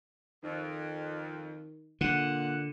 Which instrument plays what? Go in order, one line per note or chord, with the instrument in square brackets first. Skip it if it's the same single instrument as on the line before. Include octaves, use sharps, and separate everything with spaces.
[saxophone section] F2 [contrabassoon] D#3
[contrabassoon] A#2 [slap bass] D3 [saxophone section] F#5